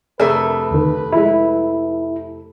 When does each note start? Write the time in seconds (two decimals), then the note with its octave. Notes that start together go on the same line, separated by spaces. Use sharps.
0.20 F2 C3 A3 D4 G#4 A#4 B4
0.70 E2 D#3
1.13 F3 G#3 E4